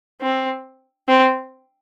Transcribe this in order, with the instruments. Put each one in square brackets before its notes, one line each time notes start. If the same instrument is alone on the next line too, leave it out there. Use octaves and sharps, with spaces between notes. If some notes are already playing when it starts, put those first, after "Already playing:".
[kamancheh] C4
C4